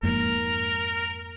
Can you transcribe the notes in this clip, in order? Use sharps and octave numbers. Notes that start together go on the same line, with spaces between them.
F2 G#2 A#3 A#4